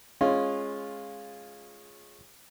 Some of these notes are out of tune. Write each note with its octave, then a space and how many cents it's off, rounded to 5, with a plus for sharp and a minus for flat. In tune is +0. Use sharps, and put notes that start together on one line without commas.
G#3 +0 C#4 -20 F4 +0